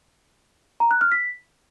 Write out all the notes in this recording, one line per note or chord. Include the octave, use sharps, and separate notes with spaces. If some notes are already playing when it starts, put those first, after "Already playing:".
A#5
F#6
F6
B6